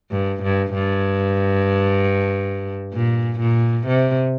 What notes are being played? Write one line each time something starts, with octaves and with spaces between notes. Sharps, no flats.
G2
G2
G2
A#2
A#2
C3